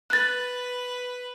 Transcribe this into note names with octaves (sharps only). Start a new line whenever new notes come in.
B4 F#6 A6